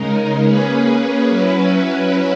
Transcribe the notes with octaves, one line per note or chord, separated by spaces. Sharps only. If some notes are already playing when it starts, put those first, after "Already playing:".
Already playing: C#3 G#3 D#4 A#4
A#3 C#4 G#4 B4
F#3 C#4 E4 B4